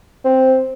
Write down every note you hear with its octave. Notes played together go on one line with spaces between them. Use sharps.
C4